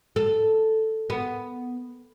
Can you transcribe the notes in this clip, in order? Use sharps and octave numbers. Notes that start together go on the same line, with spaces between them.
A4
B3